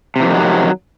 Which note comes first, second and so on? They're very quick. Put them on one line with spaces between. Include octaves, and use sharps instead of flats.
C3 E3 F2 D#3 F#3